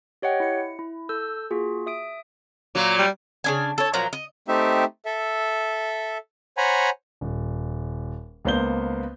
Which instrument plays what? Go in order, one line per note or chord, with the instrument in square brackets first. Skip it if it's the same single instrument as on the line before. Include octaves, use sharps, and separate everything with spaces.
[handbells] G4 C#5 D#5 F#5 G5
E4 C#7
E4
A4 E6 G6
A#3 F4 F#4 G#4
E5 D#6 D7
[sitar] A#2 F#3 A#3
[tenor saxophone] G3
[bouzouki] C#3 D4 G#5
A4 C#5
A#2 F3 F#3 A#5
D#5
[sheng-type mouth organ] A3 C4 D#4 G4 E5
A4 E5
C5 C#5 F#5 G#5 A#5 B5
[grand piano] D#1
C#2 A#3 B3 C5 G6 G7